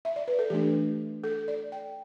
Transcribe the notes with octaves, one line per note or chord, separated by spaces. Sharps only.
E5
D5
B4
A4
E3 A3 D4 G4
A4
D5
G5